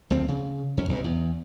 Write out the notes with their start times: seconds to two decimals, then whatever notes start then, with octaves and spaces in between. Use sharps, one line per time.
0.10 D2 F3 C4
0.28 C#3
0.77 F2 C#4
0.89 B1 G2
1.04 E2